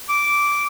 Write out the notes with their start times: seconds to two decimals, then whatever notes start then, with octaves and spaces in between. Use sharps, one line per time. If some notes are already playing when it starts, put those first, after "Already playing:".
0.09 D6